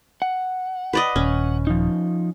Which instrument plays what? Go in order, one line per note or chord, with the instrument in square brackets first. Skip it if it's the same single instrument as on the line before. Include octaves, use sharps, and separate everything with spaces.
[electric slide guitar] F#5
[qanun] B4 D5 D#5
[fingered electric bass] D#1 [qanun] C#4
[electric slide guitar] F3 D#4